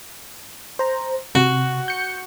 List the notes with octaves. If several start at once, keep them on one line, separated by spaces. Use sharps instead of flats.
C5 A#5
C3 F#4
G6 C#7